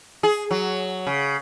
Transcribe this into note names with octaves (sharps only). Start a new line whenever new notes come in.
G#4
F#3
C#3